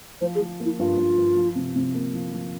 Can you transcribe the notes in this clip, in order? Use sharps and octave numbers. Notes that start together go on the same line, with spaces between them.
F3 C5
G#4
F3
A#3
E4
G2 F4
G2
G2
F3
C3
C3
A#3
F3
F3